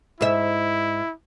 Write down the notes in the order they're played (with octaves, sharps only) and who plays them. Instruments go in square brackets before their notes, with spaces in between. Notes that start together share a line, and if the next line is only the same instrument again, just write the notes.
[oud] G#2 E5 [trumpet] E4